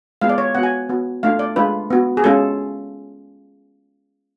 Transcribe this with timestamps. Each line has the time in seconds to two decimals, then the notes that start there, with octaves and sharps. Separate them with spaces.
0.21 G#3 B3 F4 F5
0.29 D5
0.38 C#5
0.55 B3 F#4 F#5
0.63 G#5
0.89 B3 F#4
1.23 A3 D4 F4 F5
1.39 D5
1.56 G#3 D4 F4 B4
1.90 B3 F#4
2.17 G#4
2.24 G#3 C#4 F4 A4